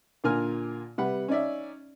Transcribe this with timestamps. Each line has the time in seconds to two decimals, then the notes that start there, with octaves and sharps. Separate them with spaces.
0.24 A#2 D3 F4 A#4 G#5 F6
0.98 C3 G3 B4 F#5 B5
1.28 C#4 D#4 D5 E5